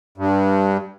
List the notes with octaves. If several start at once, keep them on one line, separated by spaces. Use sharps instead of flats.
G2